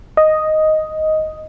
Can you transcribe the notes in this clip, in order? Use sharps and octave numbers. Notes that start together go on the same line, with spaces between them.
D#5